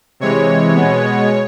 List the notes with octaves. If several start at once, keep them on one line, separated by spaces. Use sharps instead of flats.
C3 E3 G#3 C#5
B2 G#3 B3